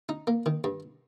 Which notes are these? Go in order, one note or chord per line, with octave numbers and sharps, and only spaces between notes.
D#4
A#3
D#3
G2